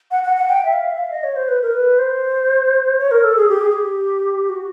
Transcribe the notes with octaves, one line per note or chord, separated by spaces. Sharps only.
F#5
F#5
F#5
G5
E5
F5
E5
F5
D#5
C#5
C5
B4
A#4
B4
C5
C#5
A#4
A4
G#4
G4
G#4
G4
F#4